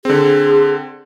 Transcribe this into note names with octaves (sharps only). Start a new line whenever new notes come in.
D3 C4 G#4